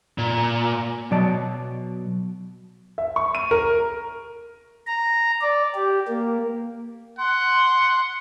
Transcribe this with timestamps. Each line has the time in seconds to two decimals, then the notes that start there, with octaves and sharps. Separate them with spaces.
0.18 A#2
1.11 B2 F#3 D5 D#5 A5
2.98 E5
3.16 C#6
3.35 D#7
3.51 A#4
4.87 A#5
5.42 D5
5.75 G4
6.08 A#3
7.19 F#5 C6